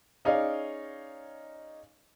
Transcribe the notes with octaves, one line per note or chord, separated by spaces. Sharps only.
C#4 D#4 G#4 C#5 D5 F5